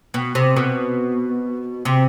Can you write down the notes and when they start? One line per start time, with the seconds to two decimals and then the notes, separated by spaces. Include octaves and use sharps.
0.14 B2
0.35 C3
0.56 B2
1.85 C3